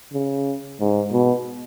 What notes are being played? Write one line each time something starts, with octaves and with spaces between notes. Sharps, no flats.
C#3
G#2
B2